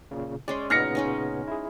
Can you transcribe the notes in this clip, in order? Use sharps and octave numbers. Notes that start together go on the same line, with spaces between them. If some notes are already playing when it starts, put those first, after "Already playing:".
A#2 C#3
G#3 C#4 D5 C6
A#2 C#3 B3 D#4 F6 A#6 C#7
G#3 C#4 D#4
E4 G#4